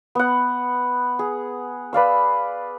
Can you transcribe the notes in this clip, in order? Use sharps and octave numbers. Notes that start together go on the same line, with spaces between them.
B3 F#5
G#4
B4 D5 F5 E6